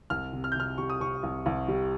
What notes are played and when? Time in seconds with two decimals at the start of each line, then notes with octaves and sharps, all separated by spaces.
0.10 C2 F6
0.33 C3
0.44 F6
0.52 G6
0.55 C3 F6
0.78 G3 C#6
0.90 D#6
1.00 C2 C#6
1.23 C2
1.46 C2
1.68 G3